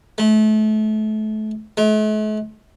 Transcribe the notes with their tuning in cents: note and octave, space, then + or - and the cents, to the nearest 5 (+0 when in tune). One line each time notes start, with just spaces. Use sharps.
A3 -30
A3 -45